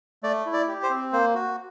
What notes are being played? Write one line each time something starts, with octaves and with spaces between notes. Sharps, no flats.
A3 D5
E4
D5
G4
C5
C4
A#3 C5
F#4